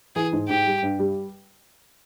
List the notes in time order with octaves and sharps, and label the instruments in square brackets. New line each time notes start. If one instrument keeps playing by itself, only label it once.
[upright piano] E3 [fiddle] G#4
[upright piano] G#2
[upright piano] G#2 [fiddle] G4
[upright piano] G3
G2
G3